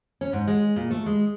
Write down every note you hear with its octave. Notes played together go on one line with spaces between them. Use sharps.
C#4
G#2
G#3
A#2
A3
G#3